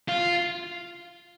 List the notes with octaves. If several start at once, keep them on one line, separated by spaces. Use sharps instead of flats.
F4